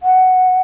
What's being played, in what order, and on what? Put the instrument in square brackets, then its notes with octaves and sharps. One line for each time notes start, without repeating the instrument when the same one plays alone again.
[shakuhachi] F#5